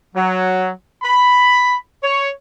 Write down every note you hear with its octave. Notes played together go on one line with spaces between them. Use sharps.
F#3
B5
C#5